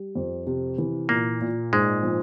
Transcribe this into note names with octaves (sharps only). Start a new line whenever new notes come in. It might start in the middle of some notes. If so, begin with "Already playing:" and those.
Already playing: G3
F2
C3
E3
A#2 A#3
A#2
G#2 G#3
F3